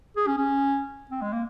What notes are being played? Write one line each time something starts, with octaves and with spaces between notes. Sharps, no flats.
G#4
C#4
C#4
C4
G#3
A#3